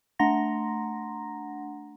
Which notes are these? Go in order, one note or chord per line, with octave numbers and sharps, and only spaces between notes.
A3 D4 F#5 A#5 C6 A#6